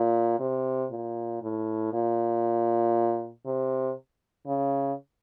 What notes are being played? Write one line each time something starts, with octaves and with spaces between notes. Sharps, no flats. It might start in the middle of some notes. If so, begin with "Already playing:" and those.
Already playing: A#2
C3
A#2
A2
A#2
C3
C#3